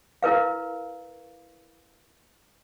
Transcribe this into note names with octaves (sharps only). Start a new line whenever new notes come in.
E4 A#4 B4 F5